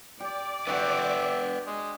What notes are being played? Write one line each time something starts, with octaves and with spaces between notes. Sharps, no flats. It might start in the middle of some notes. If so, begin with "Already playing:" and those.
G4 D5
D4 F#4 G4 B4 E5 F#5 G5
G#3